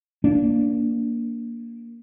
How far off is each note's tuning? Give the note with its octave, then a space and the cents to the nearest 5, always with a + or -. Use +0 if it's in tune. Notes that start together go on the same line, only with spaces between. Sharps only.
A#3 +0 D4 -20